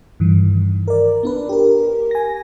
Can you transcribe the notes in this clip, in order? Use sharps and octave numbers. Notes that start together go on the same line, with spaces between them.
G2 D#3 E3
A#4 D5
B3 D4 B4
G4 A#4
G#5 A#6